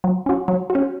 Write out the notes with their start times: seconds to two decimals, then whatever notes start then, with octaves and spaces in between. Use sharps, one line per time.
0.04 F#3
0.26 C#4 F#4
0.48 F#3
0.70 F#4
0.75 C#4